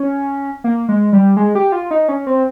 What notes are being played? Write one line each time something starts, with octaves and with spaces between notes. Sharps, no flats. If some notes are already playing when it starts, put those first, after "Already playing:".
Already playing: C#4
A#3
G#3
G3
G#3
G4
F4
D#4
C#4
C4